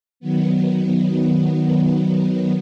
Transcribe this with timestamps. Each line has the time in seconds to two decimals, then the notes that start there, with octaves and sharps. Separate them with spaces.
0.20 D#3 F#3 B3